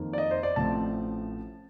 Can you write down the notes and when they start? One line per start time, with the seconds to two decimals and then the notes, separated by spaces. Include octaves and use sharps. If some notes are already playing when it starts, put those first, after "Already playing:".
Already playing: F2 D#3 A#3
0.13 D5
0.18 D#5
0.31 C5
0.43 D5
0.56 A1 A2 F3 C4 A5